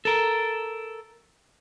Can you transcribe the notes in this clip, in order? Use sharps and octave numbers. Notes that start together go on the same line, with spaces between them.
A4 A#4